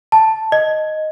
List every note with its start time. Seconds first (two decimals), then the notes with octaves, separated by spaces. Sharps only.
0.12 A5
0.52 D#5